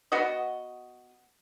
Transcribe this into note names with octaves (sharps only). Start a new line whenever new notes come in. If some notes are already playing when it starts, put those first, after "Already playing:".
B3 F#4 D#5